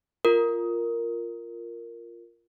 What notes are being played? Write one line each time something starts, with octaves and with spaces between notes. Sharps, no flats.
F4 A#4